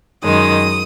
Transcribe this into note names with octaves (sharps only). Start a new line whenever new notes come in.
F#2 D#3 G#3 D#6